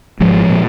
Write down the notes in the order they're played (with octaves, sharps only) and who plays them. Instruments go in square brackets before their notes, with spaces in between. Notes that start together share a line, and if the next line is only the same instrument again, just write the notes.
[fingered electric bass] G#1 G#2 F3 G#3
A#2